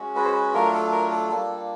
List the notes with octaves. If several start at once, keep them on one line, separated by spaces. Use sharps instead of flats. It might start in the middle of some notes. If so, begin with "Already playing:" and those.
Already playing: G#3 C#4 F#4
B4
C5
B4
F#3 A3 D4 F4 A#4
A4
A#4
A4
G3 A#3 D4 F4 A4